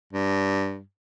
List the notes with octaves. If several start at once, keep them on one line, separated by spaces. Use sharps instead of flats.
G2